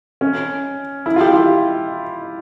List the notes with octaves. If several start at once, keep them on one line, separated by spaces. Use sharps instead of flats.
C#4
E4
F4
G4
F4